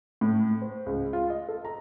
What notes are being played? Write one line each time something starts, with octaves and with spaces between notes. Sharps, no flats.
A2
C5
C#2
F4
D#5
A4
A#5